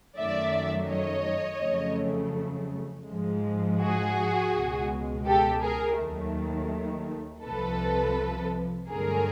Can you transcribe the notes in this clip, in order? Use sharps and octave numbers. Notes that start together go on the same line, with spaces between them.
F#2 D#3 F#3 A3 D5 E5
C#5 D#5
F2 C#3 F#3 A3
G#2 F3 G#3
F#4 G#4
C#2 B2 G#3
G4 A4
G#4 A#4
D#2 D#3 F#3 A3
C2 C3 F3 A4 B4
G2 D3 F#3 A3 G#4 A#4